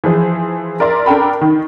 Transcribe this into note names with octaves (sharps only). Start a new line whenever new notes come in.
E3 F3 G#4 C5
A#4 D5 E5 C6
D4 A4 A#4 G5 B5
D#3